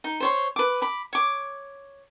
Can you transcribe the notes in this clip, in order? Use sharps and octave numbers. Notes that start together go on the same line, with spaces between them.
D#4
C5 C#5 C6
B4 D6
B5 D6
C#5 D6